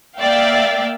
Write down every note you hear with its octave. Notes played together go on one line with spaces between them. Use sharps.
A#3 D5 E5 F5 G5